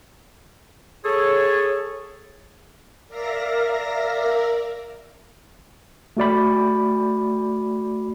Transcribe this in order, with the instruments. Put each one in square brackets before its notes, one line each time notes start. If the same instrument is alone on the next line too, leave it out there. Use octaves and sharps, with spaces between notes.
[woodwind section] G#4 A4 C#5
[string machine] A#4 D5 E5 F5 A#6
[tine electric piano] A3 F#4 D5 B5